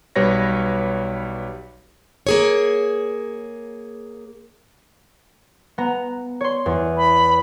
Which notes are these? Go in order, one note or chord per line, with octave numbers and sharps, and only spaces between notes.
B1 G3 B4 C#5 A#6
A#3 G#4 C#5
B3 A#5
C#5 C6
E2
B5